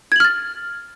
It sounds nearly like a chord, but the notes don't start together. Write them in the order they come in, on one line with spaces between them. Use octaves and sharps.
G#6 F#7 F6 A6